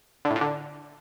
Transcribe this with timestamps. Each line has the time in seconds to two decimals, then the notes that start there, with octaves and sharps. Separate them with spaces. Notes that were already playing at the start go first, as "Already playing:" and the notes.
0.25 D3
0.30 A2
0.36 A#2
0.41 D3